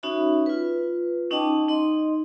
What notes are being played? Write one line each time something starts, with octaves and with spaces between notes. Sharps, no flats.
C#4 D#4 F#4 C#5 E5 B5
F4 B4
C#4 D#4 D#5 G5 A5 D6
D#4 D#5 C6